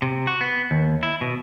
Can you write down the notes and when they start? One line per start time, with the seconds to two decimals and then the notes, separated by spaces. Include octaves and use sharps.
0.02 C3
0.27 F#4
0.41 B3
0.71 D#2
1.03 E4
1.21 B2